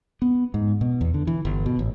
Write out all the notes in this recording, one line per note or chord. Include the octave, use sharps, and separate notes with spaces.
B3
G#2
B2
E2
D3
E3
G1
B2
A1